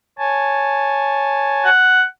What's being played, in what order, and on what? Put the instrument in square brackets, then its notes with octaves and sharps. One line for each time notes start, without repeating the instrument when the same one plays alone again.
[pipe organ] C#5 G#5 A5
[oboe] F#5